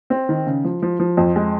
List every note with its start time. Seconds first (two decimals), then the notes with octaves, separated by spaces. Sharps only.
0.10 C4
0.29 D#3
0.47 C#3
0.64 F3
0.82 F3
1.00 F3
1.17 F2
1.36 G#3